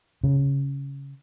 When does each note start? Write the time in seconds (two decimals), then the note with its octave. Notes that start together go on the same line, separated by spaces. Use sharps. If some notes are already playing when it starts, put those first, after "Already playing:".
0.24 C#3